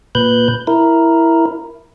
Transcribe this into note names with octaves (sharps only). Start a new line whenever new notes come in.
A#2 B4 F#6 G6
E4 A#4